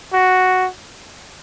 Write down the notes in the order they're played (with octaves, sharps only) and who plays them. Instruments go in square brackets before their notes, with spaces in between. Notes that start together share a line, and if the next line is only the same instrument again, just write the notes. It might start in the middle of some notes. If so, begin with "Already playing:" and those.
[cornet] F#4